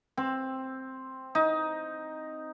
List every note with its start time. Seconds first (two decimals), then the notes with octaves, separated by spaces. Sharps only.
0.17 C4
1.35 D#4